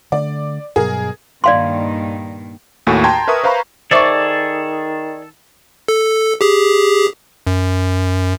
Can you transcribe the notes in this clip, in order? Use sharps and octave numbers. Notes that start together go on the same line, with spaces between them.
D3 A3 D5
G2 B2 F#3 G#4 A#4
G2 A#2 D#3 D5 F5 C6
D#2 A2 F#4 A4 G#5 C#6
G5 A5 A#5 C6 G#6
A#4 B4 E5 C#6 D#6
B4 C5 F5 A#5 B5 C#6
D#3 G#4 A4 C5 D5 E5 C#6 D6
A4
G4 G#4
F#2